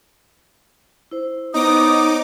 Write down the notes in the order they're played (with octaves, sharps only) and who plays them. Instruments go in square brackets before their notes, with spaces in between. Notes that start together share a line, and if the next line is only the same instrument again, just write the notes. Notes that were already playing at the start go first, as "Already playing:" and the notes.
[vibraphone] E4 C5
[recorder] B3 [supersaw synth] D#4 D6 [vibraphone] C5 C#5 [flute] D#6